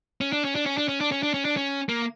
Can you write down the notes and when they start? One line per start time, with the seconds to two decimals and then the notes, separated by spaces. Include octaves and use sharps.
0.21 C#4
0.33 D4
0.45 C#4
0.55 D4
0.66 C#4
0.78 D4
0.89 C#4
1.01 D4
1.12 C#4
1.23 D4
1.34 C#4
1.45 D4
1.57 C#4
1.89 A#3